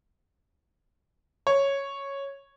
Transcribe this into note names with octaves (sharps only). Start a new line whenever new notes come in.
C#5